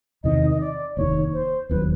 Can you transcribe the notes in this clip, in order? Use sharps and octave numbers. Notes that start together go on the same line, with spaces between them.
E2 C3 D#3 D#5
D#5
D5
F1 D#2 D#3 C#5
C5
E1 D#2 D#3 F#3 B4